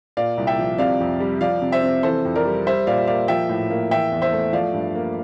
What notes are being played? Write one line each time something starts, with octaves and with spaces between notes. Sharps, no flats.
A#2 D5 F5
C2
E5 G5
F3
C3 D5 F5
F2
G3
F3 D5 F5
C3
C5 E5
C4
E3 A4 C5
F2
A#4 D5
G3
G3 C5 E5
A#2 D5 F5
A#3 D5 F5
F3 E5 G5
A2
A#3
E3 E5 G5
E2
C5 E5
A3
F3 D5 F5
G2
A#3